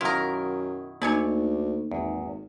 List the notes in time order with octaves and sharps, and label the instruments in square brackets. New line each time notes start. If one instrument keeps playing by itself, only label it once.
[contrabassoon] F#2 [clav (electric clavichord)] B2 D#3 E4 [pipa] F4 A#4
[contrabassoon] D2 [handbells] A#3 D#4 [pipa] D5 G#5 C#6
[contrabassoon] G#1 [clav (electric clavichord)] E2